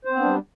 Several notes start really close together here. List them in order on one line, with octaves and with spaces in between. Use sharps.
C5 C4 B3 D4 G3